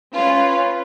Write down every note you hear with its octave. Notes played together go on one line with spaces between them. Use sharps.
C#4 F4 B4